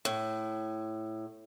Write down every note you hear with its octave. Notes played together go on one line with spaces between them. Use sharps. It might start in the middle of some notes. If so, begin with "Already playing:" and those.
A2